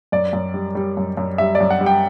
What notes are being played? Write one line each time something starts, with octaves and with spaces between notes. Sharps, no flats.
F#2 D5
F#2
G3
G3
F#2
F#2
G3 E5
D5
F#2
F#5
G3
G5